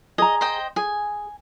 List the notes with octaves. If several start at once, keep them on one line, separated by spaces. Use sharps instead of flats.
G#4 D#5 A#5
C5 D#5 G5
G#4 G#5